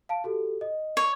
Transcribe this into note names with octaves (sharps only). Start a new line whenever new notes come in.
F5 A5 D7
F#4 G4 A4
D#5
C#5